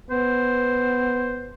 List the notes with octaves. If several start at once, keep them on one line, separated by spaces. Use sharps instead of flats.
B3 C5